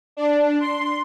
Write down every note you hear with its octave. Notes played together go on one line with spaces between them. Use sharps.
D4
C6